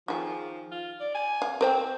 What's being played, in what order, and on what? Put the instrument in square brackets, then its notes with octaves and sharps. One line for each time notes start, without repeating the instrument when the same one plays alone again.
[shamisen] D#3 G#4 [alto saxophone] F3
[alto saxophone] F4
D5
G#5
[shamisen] F5
[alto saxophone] C4 [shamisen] A#4 C5 G5